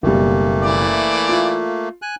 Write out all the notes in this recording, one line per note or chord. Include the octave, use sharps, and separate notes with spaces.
F#1 B2 G3 A3 A#3
E3 D5
F4
G#5 F#6